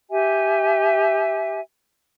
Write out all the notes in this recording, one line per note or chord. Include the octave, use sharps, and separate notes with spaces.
G4 E5 G#5